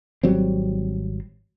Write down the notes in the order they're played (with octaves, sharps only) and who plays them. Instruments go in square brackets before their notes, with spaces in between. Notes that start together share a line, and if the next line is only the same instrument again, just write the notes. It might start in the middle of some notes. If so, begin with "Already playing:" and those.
[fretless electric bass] G#1 F#3 G3 C4